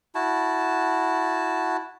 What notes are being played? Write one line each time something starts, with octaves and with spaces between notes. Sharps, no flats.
E4 F#4 A5